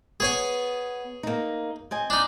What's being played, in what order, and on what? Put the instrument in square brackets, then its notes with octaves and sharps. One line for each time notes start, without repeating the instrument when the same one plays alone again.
[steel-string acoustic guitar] B3 [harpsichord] G#4 C#5 G#5
[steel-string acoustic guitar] A#3 D#4
C4 D#5 G#5
[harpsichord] D4 D#4